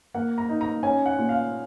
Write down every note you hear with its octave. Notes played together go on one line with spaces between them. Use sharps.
A#3 F#5
A#5
D#4
A#5
C#4 G#5
F#5
A#2
F5